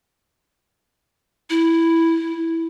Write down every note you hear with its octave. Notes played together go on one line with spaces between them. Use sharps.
E4